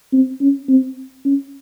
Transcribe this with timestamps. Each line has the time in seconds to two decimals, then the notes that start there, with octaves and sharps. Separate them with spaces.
0.12 C4
0.41 C#4
0.68 C4
1.25 C#4